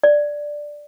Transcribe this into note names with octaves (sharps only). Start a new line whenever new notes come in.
D5